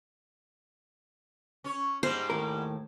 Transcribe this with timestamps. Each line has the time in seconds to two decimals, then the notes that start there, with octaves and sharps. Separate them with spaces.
1.64 C#4 C#5
2.03 G#2 G3 G#3 C5
2.30 D#2 A2 A#4